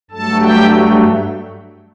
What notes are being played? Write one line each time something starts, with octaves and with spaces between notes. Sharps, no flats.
G2 F#3 A3 A4 A5
G4 G5